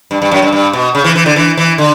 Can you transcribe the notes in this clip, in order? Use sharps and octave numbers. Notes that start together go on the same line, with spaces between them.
G2
G2
F#2
G2
G2
B2
C#3
E3
E3
D3
E3
E3
D3